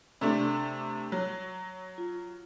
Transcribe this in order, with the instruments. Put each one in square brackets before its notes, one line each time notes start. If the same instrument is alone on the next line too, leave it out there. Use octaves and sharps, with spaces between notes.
[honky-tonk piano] C3 A3 D4
F#3
[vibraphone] F4